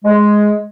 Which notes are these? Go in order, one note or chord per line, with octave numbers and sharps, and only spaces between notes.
G#3